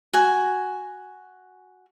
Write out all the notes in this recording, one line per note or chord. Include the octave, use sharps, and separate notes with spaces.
F#4 G#5